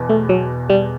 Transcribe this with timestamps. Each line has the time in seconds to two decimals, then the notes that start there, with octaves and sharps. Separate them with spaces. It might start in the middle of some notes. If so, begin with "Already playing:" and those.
Already playing: E2 B2
0.09 A3
0.29 F#3
0.70 G3